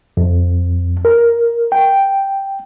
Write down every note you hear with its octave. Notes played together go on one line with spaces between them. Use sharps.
F2
A#4
G5